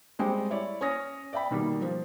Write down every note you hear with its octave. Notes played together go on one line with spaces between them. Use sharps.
G3 G#3 C4 G4
E4 C#5 D5
C#4 C#5 G#5 D#6 A#6
D5 E5 G5 B5
B2 D#3 G3 A#3
F3